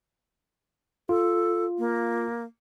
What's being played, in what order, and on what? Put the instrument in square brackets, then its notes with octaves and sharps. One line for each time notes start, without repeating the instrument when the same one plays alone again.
[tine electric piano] F4 [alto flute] A4
[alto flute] A#3